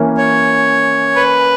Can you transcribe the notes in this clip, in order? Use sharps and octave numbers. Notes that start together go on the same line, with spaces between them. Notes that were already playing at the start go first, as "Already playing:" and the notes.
Already playing: E3 A#3 C#4
C#5
B4